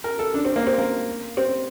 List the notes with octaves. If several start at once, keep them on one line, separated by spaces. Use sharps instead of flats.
A#4
A4
D4
C4
A#3
C4
A#3
C4